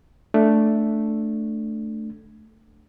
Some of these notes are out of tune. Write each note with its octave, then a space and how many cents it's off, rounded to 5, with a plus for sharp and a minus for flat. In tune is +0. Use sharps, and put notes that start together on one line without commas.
A3 +0 D4 +0